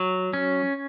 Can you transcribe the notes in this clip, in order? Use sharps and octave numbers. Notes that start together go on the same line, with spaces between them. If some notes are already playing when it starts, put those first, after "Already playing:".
Already playing: F#3
C#4